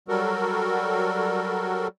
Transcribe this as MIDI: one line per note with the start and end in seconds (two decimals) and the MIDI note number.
0.08 1.88 54
0.08 1.88 55
0.08 1.88 66
0.08 1.88 69
0.08 1.88 70